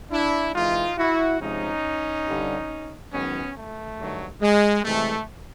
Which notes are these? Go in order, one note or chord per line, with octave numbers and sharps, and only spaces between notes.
D4 E4
C3 E3 G#3 D#4 F4
E4 F#4
C3 F3 G#3 C#4 D#4
G2 D3 G3
G#2 D#3 F#3 B3 C#4
A3
G2 D#3 F#3
G#3
C3 E3 G#3 A3